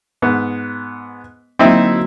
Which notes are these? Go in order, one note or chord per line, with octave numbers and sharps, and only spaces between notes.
G#2 B3
D3 F#3 A#3 C4 D#4 E4